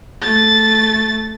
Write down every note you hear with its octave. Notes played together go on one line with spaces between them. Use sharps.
A3 A6